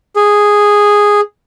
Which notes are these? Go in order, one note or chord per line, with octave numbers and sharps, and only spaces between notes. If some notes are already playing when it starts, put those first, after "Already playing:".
G#4